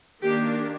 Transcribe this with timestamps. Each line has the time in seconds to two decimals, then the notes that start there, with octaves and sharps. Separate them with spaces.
0.22 D#3 A#3 D4 G4